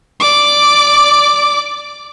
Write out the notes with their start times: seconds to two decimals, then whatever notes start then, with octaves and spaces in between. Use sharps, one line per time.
0.20 D5 D6